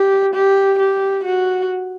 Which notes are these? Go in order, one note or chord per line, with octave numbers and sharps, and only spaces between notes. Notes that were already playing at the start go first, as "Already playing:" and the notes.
Already playing: G4
G4
G4
F#4